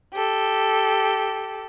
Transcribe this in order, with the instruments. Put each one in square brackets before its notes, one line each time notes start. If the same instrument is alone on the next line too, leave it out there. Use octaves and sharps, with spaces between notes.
[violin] G4 A4